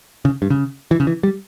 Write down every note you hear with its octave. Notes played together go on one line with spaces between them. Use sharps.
C#3
G2
C#3
E3
C#3
E3
G3